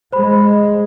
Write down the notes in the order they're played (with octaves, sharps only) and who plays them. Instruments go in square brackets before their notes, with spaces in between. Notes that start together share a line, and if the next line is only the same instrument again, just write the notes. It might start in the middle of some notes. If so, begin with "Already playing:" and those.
[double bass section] G#3 [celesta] C5 B5